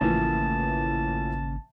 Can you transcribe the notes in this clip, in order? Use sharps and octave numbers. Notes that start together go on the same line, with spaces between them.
G#1 A2 C#3 E3 F3 A#3 A5